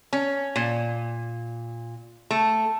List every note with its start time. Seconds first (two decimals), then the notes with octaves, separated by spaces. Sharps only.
0.13 C#4
0.56 A#2
2.31 A3